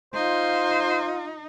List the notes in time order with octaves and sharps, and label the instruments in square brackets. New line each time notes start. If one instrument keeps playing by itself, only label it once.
[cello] D#4 [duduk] F4 [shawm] C5 [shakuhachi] F5